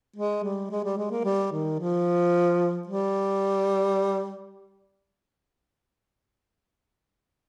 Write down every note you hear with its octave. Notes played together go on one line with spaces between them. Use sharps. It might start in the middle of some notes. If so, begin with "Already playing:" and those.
G#3
G3
G#3
G3
G#3
A#3
G3
D#3
F3
G3